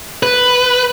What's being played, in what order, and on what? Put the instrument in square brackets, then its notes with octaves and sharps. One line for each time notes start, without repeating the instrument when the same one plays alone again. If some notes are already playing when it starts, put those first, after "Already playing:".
[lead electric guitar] B4